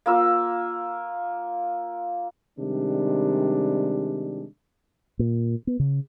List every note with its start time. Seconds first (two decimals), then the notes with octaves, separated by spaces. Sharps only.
0.06 A#3 F4 E6
2.59 C3 D#3 G3 G#3 D4
5.19 A#2
5.67 B3
5.80 C#3